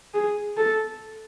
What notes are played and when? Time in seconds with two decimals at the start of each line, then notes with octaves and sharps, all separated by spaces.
0.14 G#4
0.57 A4